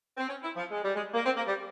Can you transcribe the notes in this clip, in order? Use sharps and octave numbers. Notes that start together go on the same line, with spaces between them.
C4
C#4
E4
F3
G#3
G3
G#3
A#3
C4
A#3
G3